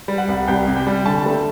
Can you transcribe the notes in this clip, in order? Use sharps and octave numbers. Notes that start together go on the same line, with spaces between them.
G3
F#5
C2
C2 G5
C3
G5
G3
D3 A5
A3